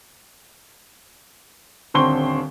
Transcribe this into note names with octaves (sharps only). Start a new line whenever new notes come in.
D#1 D3 C4 C6 C#6 G7